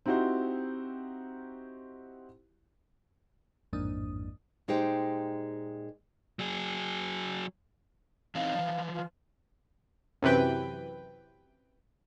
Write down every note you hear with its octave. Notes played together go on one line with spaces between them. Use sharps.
C4 D#4 E4 F#4 G4 C5
A1 F2 G#2 A#3 D4 D#6
A#2 G#3 D#4 G4 C5 G5
F#3 G#4
E3 C4 D#4 F5
E3 F3
F4
F#2 C3 E3 B4 G5